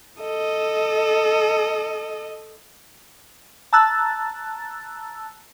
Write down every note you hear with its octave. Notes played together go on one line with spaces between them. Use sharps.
A4 D#5
A5 A#5 E6 F#6 A6